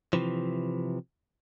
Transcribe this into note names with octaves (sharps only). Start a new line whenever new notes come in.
C3 E3 F3